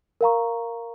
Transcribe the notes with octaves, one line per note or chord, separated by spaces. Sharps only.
A#4 F5 A#5 C#6